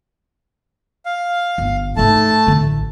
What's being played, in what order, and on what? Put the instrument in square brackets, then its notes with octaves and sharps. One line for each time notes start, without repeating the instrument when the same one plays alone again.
[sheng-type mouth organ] F5
[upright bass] G1
[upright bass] G#2 D#4 [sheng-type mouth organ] A3 A5
[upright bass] A1 D3